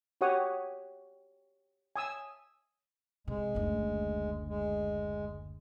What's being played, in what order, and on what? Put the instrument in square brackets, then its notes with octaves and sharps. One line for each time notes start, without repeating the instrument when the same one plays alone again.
[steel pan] F#4 G4 C#5 F#5 D#6
G#5 D#6 E6
[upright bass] C3 [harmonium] G#3
[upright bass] F#1 D2
[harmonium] G#3